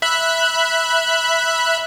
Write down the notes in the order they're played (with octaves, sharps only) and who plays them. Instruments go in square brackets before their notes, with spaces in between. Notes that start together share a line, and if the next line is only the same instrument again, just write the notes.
[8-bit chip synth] E5 B5 F#6